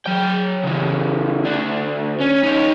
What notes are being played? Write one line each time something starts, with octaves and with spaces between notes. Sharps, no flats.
F#3 G5
C#3 E3
D2 D4
C#4
D#4 C#5